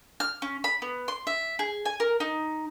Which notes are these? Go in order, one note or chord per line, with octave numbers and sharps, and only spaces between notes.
F6
C#4
B5
B3
C6
E5
G#4
G#5
A#4
D#4